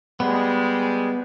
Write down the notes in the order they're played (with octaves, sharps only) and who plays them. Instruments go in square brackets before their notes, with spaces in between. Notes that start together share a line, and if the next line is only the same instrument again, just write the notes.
[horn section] G3 G#3 [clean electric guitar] B3